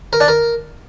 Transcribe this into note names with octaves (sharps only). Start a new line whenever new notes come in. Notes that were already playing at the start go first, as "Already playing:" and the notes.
A#4
D4
A#4